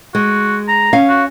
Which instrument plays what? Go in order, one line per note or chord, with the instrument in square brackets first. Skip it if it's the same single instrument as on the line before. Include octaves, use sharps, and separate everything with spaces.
[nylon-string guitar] G#3 [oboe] F#4
[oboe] A#5
[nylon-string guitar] C#4 F5
[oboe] F#4